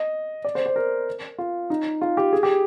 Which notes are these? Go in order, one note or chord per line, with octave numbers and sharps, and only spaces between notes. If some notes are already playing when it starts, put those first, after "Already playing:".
Already playing: D#5
D5
C5
C5
A#4
F4
D#4
F4
G4
G#4
G4